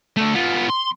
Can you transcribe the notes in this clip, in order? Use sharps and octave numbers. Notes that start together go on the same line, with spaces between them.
D3 A3
B3 F4
C6